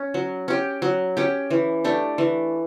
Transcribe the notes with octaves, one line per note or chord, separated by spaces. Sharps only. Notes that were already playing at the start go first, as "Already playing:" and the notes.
Already playing: C#4
F#3
C#4 G4
F#3
C#4 G4
E3
A3 D4 G4
E3